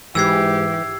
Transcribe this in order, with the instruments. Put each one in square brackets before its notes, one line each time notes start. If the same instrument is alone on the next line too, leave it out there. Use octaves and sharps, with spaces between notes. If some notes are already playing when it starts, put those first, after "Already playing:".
[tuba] G#2 [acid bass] E3 [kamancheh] G4 [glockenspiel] E6 G#6 C7